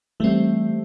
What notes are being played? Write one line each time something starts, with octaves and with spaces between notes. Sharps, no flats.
E3 G3 A3 C4